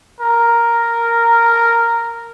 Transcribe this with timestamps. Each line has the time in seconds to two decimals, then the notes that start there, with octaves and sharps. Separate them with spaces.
0.20 A#4